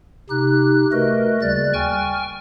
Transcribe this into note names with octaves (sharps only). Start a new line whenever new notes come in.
C3 D#4 G4 F#6
A3 F#4 A#4 B4 D#5
D#2 C#3 G3 D5 F#6 A6
G5 G#5 C#6 F6